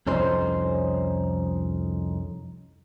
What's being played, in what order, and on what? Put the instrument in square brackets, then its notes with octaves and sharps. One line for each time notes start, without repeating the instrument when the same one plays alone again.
[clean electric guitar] C2 F2 C#4 D#4 C5